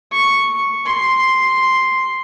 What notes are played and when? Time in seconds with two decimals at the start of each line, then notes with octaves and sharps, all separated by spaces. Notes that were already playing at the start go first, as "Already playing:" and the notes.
0.12 C#6
0.86 C6